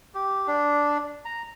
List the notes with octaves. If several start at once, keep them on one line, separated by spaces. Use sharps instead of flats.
G4
D4
A#5